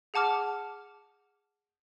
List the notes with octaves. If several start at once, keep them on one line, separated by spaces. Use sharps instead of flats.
G#4 F#5 A5 D6 F6